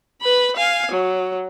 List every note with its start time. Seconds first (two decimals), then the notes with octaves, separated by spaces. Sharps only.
0.22 B4 B5
0.56 F5 G#5
0.92 F#3